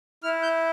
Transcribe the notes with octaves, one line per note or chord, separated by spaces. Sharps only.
E4 F6
G6